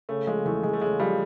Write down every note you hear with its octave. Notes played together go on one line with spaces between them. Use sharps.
C#3 A3
F3 G#3
E2 A3
E2 G#3
A3
C#3 G#3
F3 G3